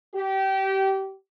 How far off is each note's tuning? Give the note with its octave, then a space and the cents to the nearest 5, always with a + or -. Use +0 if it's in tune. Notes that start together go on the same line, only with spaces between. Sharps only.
G4 -25